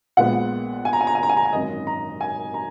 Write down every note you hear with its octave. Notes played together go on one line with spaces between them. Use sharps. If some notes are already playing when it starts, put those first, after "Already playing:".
A#1 A#2 G#3 B3 F#5
G#5
A#5
G#5
A#5
G#5
A#5
G#5
A#5
G#5
G#1 F#2 D#3 D#5
A#5
G#5
A#5